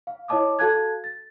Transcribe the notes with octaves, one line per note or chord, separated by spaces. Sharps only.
F5
E4 C#5 D#5 A5 D6 D#6
F#4 A4 F5 A5 F#6 G#6
A6